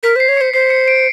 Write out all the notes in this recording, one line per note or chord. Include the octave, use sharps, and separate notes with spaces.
A#4 B6
C5 C7
C#5
C#7
C5
C5 C7
C#7
D7